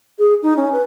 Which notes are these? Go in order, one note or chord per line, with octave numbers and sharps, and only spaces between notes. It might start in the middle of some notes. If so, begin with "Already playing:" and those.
G#4
D#4
C#4
B4